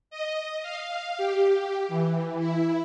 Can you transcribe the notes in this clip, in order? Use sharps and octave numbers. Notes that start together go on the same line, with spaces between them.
D#5
F5
G4
E3
E4